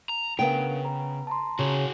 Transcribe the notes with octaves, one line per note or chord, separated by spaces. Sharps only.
A#5
C#3 B3 D4 A#4 F5 G5
B4 A#5
A5 A#5 C6
C#3 F#4 G#4